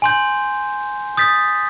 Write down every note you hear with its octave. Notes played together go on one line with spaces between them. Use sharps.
G#5 C6 G6
D#6 G6 A6 B6